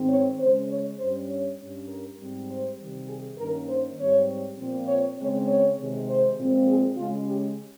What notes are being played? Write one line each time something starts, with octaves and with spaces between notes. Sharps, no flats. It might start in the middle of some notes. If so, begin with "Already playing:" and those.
Already playing: G#2 D#3 G#3 C4
C#5
C#3 G#3 C#4 C5
C#5
G2 G3 C#4 C5
C#5
G2 G3 C#4
A#4
G#2 G3 C4
C5
C3 D#3 G3
G#4
G2 D#3 A#3 C#4 A#4
C5
G#2 G3 C4 C#5
A#2 F3 C4
C#5
C#3 G#3 C4 C#5
C#5
C3 D#3 G#3
C5
A#2 F3 G#3 C4
G#4
C#3 G#3 C#4 F4
G4